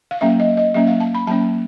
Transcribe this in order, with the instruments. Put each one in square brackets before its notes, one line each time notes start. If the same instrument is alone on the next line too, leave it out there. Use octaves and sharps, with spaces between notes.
[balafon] F5
F#3 A#3 C#4 E5
D#5
D#5
F#3 A#3 C#4 E5
F5
A5
B5
F#3 A#3 C#4 A5